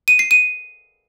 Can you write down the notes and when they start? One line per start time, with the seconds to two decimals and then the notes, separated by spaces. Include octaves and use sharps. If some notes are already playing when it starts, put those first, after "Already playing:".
0.08 D#7
0.19 C7
0.31 D#7